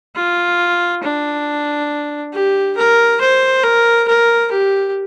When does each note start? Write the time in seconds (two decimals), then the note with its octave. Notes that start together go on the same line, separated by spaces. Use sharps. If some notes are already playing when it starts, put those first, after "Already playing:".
0.15 F4
1.02 D4
2.32 G4
2.76 A#4
3.21 C5
3.63 A#4
4.07 A#4
4.51 G4